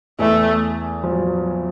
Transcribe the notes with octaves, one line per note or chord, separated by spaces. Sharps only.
E2 E3 A3
F3
F#3